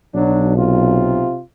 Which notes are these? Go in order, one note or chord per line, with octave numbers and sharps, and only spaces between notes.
B1 F#3 D4
C3 F4